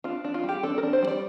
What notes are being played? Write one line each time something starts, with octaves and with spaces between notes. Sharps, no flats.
D4 F4
D4
F4
G3
G4
D4 A4
A#4
D4
C5
G3 D5